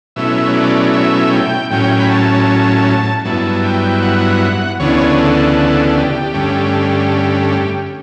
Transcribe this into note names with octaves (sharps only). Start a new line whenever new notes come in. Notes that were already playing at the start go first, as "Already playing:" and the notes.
B2 F#3 A3 C#4 E4 E5
D5
E5
G5
A2 F#3 C#4 G5
B5
A5
G2 F#3 B3 E4 A5
G5
F#5
D2 C#3 E3 B3 D4 C#5
A4
A4
G4
G2 D3 A3 C#4